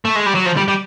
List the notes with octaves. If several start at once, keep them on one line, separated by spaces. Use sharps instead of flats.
A3
G#3
G3
F#3
F3
G3
G3